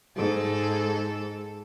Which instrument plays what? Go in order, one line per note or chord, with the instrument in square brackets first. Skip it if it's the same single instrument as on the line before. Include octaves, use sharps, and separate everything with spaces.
[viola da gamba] G#2 A4